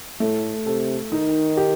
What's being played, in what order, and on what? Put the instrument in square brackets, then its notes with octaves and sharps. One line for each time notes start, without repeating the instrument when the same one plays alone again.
[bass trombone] A2 [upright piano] A3
[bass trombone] C3 [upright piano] A4
[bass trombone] D#3 [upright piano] D#4
[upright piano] G4